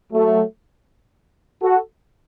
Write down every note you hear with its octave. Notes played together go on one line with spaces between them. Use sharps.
F#3 A3
F#4 A4